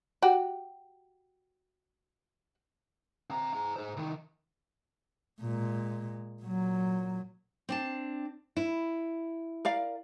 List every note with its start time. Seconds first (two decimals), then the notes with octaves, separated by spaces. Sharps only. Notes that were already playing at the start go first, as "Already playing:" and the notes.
0.22 F#4 G4
3.30 C4 A#5
3.54 G#4 A#5
3.76 G#4 C5
3.97 C2 D#3
5.40 A#2 G#3
6.42 A#2 F#3
7.69 C4 D4 A5
8.56 E4
9.65 A#4 D5 F5